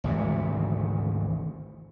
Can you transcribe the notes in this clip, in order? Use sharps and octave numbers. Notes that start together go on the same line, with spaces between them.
G#1 D2 C3 E3